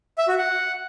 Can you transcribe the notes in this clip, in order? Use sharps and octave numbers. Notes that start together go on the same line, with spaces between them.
E5
F#4
F#5